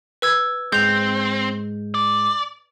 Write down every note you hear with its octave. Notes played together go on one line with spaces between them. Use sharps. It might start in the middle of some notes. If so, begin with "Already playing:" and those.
B4 E6 G#6
G#2 G#3 C4 G6 F7
D5